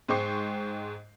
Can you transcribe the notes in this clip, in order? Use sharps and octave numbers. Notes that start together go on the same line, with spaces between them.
G#2 G#3 C5 G5 C#6 C7